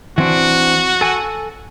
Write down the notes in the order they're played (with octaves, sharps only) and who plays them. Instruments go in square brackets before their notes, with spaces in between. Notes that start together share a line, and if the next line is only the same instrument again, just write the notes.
[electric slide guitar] E3 C4 D4 [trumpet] F#4
[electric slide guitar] A4 G#5